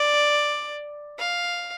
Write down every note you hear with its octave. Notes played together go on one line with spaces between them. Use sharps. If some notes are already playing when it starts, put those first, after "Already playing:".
Already playing: D5
F5